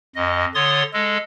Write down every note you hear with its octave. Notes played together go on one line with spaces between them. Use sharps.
F2 D#5
D3 C#5 C6 D#6 A6
G#3 A4